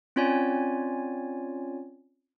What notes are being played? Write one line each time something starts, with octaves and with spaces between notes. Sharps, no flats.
C4 C#4 F4 C#5 D5 G#5